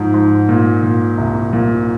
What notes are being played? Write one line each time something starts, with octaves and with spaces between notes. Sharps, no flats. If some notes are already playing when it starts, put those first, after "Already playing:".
Already playing: G#2 F3
G#2
A#2
A#2
C2
A#2